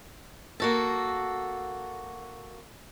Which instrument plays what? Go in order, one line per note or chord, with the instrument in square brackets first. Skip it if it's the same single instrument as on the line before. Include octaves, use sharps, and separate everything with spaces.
[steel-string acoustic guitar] A#3 F#4 A4